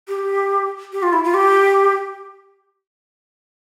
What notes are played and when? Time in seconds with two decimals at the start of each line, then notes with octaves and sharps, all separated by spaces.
0.08 G4
0.92 G4
1.03 F4
1.13 E4
1.24 F4
1.34 G4